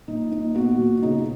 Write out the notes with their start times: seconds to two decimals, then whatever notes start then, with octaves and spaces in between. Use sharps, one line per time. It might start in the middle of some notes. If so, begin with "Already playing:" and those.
0.08 A#2 D#4
0.31 A#3 D#4
0.55 B3 F#4
0.79 A#2
1.02 C#3 D#4